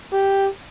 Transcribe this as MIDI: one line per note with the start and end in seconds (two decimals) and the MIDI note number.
0.13 0.47 67